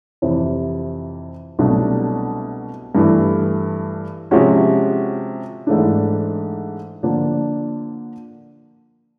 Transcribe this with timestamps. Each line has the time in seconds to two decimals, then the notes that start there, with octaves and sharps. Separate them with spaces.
0.22 F2 C3 E3
1.59 C2 B2 F#3 A3 D4
2.95 G2 E3 A3
4.31 C3 F3 G#3 C#4 F#4
5.67 G#2 E3 A3 D4
7.03 D3 F3 A#3 D4